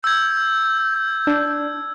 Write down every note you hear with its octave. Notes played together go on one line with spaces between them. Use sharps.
E6 G6 G#6
D4